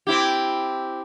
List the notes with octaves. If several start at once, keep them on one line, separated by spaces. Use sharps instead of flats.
C4 E4 G4